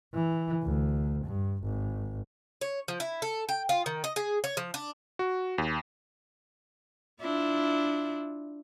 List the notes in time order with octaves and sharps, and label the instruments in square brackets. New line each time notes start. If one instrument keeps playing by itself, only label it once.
[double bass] E3
D2
G2
G#1
[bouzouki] C#5
F3
E4
A4
G5
F4
D#3
D#5
G#4
C#5
F3
D4
[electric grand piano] F#4
D#2
[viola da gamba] D4 E4 F4